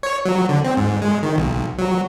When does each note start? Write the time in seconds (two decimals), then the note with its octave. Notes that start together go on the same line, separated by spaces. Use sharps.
0.03 C#5
0.25 F#3
0.49 D3
0.64 C4
0.77 G#2
1.02 G#3
1.23 D#3
1.38 B1
1.78 F#3